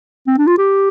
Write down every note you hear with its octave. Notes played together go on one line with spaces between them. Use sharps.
C4
D4
F4
G4